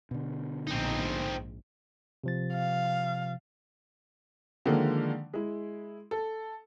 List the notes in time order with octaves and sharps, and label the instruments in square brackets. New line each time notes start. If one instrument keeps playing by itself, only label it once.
[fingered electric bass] B2 D3
[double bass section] A#1 G#2 [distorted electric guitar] C4 D#4
[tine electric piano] C3 F3 A6
[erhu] F5
[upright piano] D3 D#3 F3 G#3 A#3
G#3 E4
A4